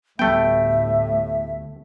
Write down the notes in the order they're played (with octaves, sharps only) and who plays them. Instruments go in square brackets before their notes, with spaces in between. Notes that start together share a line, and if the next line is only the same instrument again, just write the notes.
[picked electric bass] D2 G3 B3 [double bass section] A2 [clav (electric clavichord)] A3 G5 [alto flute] E5